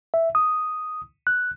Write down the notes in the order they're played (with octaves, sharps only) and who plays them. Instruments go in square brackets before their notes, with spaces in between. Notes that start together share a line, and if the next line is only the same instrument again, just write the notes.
[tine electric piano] E5
D#6
F#6